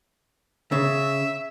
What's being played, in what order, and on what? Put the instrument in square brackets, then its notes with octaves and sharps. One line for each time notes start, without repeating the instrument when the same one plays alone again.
[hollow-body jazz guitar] C#3 [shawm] E5